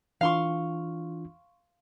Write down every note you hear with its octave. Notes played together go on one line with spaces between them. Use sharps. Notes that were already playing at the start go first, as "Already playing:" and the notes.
E3 D4 F4 F5 C6 C#6